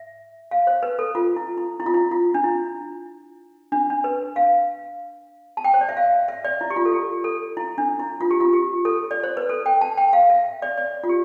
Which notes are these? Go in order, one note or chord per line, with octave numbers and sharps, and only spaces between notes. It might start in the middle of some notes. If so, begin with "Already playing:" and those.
Already playing: E5
F5
C5
B4
A4
F4
E4
E4
E4
F4
E4
F4
D4
E4
D4
D4
B4
F5
A5
G5
C5
D5
E5
F5
E5
D5
E4
G4
F4
A4
G4
A4
E4
D4
E4
F4
G4
F4
G4
A4
D5
C5
B4
A4
G5
A5
G5
F5
E5
D5
D5
F4
G4